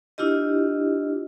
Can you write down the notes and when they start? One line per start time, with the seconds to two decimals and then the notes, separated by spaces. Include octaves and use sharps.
0.18 D4 E4 F4 G4 D#5